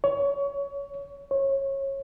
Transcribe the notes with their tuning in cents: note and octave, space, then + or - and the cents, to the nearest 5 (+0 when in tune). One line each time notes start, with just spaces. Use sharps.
C#5 +25
C#5 -25